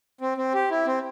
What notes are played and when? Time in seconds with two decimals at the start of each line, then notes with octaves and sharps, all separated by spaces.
0.21 C4
0.38 C4
0.54 G4
0.71 E4
0.86 C4